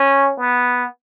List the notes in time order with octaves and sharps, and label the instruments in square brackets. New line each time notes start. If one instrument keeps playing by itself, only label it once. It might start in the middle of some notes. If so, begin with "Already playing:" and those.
Already playing: [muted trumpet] C#4
B3